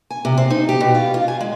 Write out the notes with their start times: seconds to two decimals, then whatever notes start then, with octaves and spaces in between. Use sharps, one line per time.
0.10 G#5
0.25 C3
0.38 C4
0.50 D#4
0.69 G4
0.80 B2
0.95 F4
1.14 F4
1.28 G#5
1.40 G#3